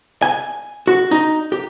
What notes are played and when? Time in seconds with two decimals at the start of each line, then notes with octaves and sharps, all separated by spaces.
0.22 G#5
0.87 F#4
1.11 D#4
1.52 G4